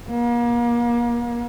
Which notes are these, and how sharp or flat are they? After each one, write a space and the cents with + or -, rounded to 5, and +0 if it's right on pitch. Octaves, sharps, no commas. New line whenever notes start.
A#3 +35